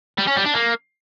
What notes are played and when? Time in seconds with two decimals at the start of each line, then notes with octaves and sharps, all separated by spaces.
0.18 G3
0.27 C#4
0.36 G3
0.45 D4
0.55 A#3